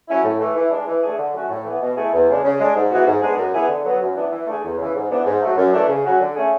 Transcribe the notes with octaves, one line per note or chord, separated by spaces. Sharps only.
F#3 C#4 E4
A2
E3 A3
E3
G#3 D4
E3
A3 D4 G#4
D3
F#3 A3 C#4 F#4
A2
E3 B3
B2
A3 E4 G#4
E2
C#3 G#3 D4
C#3
G#3 D4
G#2
E3 G#3 B3 F#4
G#2
G#3 B3 D4 G#4
F#2
E3 B3 E4 G#4
D3
F#3 B3
F#2
E3 B3 D4
E3
A3 D4 G#4
E2
C#3 E3
G#2
E3 B3 D4
G#2
F#3 A3
F#2
E3 A3 D4
C#3
F#3 C#4 F#4
D3
A3 C#4 G#4